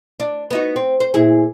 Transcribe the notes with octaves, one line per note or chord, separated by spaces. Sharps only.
D4
B3 D#4 F#4
C4
C5
A#2 E4 G#4